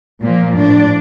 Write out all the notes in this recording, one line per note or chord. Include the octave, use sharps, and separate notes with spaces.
A#2 F3 A#3
A2 F3 D4